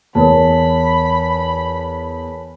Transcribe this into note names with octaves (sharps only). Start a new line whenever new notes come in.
E2 A#4 C#5 A5 B5